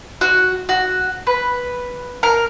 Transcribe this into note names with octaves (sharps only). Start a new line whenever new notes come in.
F#4
F#4
B4
A#4